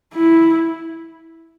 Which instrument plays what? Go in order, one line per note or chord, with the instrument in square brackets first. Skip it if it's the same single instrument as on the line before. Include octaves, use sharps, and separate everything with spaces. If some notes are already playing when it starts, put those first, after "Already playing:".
[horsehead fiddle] E4